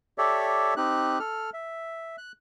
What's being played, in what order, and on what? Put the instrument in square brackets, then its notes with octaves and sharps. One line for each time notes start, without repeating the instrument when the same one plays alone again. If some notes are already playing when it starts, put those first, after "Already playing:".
[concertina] G4 A4 C#5 D5 E5
C4 D#4 G4 F#6
A4 F6
E5
F#6